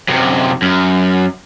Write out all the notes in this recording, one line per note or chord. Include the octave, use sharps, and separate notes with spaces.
F#2 C3
F#2